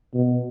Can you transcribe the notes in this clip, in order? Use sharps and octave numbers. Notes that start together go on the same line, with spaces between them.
B2